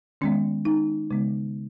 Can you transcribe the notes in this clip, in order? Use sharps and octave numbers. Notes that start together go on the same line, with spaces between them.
D#3 G#3 B3 C#4
D#4
C#3 G#3 B3